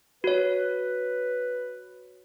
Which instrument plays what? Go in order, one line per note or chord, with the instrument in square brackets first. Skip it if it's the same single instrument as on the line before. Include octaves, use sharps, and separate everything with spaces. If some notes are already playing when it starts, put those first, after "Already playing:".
[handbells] F#4 C#5 [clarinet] B4